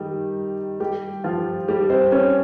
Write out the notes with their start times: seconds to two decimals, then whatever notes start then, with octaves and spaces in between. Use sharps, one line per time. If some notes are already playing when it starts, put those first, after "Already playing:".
Already playing: D#3 G3 D#4 G4
0.80 G3 G4
1.24 F3 F4
1.68 G3 G4
1.90 C4 C5
2.12 C#4 C#5